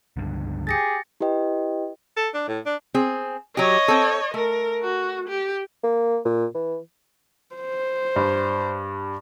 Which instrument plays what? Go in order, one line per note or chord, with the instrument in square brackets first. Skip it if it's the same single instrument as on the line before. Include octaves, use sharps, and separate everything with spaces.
[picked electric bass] C#2 G2 D3
[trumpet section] G4 G#4 [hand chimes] A6 A#6 C#7
[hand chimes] E4 G4 B4 D#5 G5
[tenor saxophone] A4
D4
A2
D4
[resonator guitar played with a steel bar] C4 G#4
[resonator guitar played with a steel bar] F#3 G4 [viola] C#5 D#5
[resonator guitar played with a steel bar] C4 A4
[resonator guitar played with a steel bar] A3 [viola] A#4
[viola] F#4
G4
[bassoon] A#3
A#2
E3
[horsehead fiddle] C5
[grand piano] G2